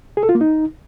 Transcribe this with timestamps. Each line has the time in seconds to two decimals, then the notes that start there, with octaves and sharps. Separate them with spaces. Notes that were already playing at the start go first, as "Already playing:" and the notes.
0.17 G#4
0.23 A4
0.29 F4
0.35 A#3
0.41 D#4